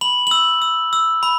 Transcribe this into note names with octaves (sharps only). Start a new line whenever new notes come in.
B5 F#7
E6 F#7
E6
E6
B5